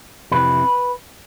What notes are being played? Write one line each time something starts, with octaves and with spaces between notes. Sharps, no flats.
F2 C3 E3 B4